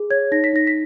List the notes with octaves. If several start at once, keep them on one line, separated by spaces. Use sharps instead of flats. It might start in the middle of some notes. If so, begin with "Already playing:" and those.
Already playing: G#4
C#5 G#6
D#4 A#6
B6
D#4 A#6
B6